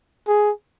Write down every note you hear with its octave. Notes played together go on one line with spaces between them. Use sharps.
G#4